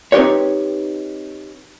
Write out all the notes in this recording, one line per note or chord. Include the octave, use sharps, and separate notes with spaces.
C4 D#4 F4 G4 B4 C#5